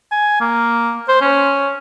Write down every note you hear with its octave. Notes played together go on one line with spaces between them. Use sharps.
G#5
A#3
C5
C#4